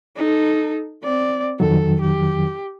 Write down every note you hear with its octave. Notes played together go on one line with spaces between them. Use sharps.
D#4 A4
C4 D5
F2 D#3 F#3 A4
G4